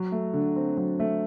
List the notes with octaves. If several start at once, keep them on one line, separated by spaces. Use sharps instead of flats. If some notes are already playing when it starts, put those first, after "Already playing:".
Already playing: F#3
A3
D3
C4
F#3
A3